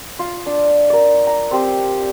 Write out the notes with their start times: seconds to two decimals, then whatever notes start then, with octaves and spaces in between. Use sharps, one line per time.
0.19 F4
0.46 D4
0.90 A#4 D5
1.27 A#5
1.51 C4 G4 C5